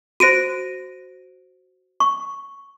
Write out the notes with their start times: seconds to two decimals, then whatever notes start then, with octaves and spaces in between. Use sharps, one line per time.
0.20 F#4 C5 A#6 D7 D#7
2.00 C#6